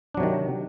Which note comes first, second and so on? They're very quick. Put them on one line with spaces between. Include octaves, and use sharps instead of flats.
D4 F#3 C3 D#3